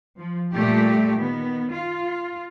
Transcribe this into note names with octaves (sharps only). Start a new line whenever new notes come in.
F3
A#2 G3 A3 G4
D#3 B3
F4